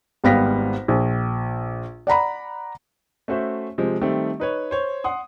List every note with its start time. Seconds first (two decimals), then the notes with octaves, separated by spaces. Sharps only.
0.24 G#1 G3 B3 F5 A#6 B6
0.88 A#1
2.07 D5 F#5 A#5 B5
3.28 A3 C#4 F#4 C5 E5
3.78 C3 F3 G#3
4.01 D#3 G3 A3 C4
4.40 D#4 B4 C#5
4.71 C5 C#5
5.04 F#5 C6 D#6